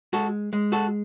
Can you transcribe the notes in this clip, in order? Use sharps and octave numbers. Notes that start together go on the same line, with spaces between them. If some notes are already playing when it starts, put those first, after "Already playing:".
G#3 F#4 A4
G#3
F#4 A4